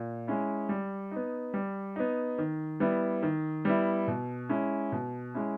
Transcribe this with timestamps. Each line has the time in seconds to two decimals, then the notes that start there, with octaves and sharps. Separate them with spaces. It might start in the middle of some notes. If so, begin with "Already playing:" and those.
Already playing: A#2
0.27 G#3 C#4 E4
0.69 G3
1.11 B3 D#4
1.54 G3
1.96 B3 D#4
2.39 D#3
2.80 G3 B3 E4
3.23 D#3
3.65 G3 B3 E4
4.08 B2
4.49 G#3 C#4 E4
4.92 B2
5.34 G#3 C#4 E4